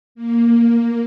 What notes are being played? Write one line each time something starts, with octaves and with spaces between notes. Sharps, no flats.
A#3